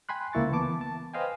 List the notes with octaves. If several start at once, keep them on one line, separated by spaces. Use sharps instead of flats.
G5 G#5 B5 C6 F#6
C#2 A#3 E4 C#6 A6
E3 B3 A5 D6
A5
B4 C5 D#5 F5 G5 G#5